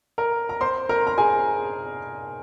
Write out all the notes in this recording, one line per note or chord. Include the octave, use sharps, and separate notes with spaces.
A#4 A#5
A#5
C5 C6
A#4 A#5
A#5
G#4 G#5